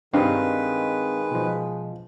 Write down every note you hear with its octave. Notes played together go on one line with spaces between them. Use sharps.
G2 D#3 G#3 C4 D#4 B4 F5
B2 F3